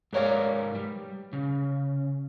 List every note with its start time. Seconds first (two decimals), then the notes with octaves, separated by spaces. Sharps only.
0.13 G#2 A#4 B4 C#5 D5 F5
0.75 G3
1.33 C#3